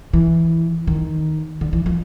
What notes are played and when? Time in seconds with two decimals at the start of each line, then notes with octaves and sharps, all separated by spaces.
0.14 E3
0.87 D#3
1.61 D3
1.73 E3
1.86 F3